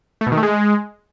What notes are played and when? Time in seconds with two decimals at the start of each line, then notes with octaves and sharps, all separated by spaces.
0.21 A3
0.26 B2
0.32 D#3
0.37 A3
0.43 G#3